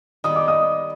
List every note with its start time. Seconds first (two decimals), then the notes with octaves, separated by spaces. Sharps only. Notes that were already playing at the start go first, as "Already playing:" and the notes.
0.24 D#3 G3 B3 D#6
0.36 D6
0.48 D#5 D#6